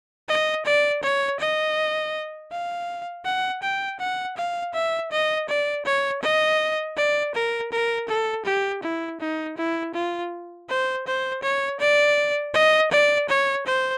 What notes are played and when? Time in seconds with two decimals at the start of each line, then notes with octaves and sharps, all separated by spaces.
0.28 D#5
0.65 D5
1.03 C#5
1.40 D#5
2.52 F5
3.25 F#5
3.63 G5
4.00 F#5
4.37 F5
4.74 E5
5.12 D#5
5.49 D5
5.85 C#5
6.23 D#5
6.97 D5
7.35 A#4
7.72 A#4
8.08 A4
8.46 G4
8.83 E4
9.20 D#4
9.57 E4
9.94 F4
10.69 C5
11.07 C5
11.43 C#5
11.80 D5
12.54 D#5
12.92 D5
13.29 C#5
13.66 C5